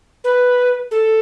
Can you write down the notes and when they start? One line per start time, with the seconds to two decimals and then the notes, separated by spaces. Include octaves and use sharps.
0.24 B4
0.91 A4